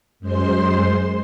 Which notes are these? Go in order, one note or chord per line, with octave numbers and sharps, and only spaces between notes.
F#2 G#3 C5 C6